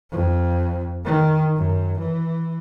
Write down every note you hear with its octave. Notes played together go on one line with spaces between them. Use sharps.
F2
D#3
F#2
E3